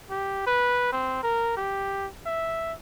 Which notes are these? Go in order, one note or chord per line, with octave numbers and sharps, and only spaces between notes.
G4
B4
C4
A#4
G4
E5